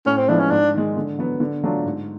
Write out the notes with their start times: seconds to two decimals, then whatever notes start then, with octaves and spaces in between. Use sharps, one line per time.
0.06 A2 C#4
0.18 C4
0.28 F3 G#3 B3 D4 E4
0.40 C#4
0.51 G#2 D4
0.74 D#3 G#3
0.96 D3
1.19 F#3 B3
1.40 D3
1.64 F#3 A3 D4 F4
1.85 G#2